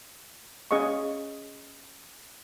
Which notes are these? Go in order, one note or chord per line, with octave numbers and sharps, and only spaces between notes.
C#4 G#4 D#5 F5 C#6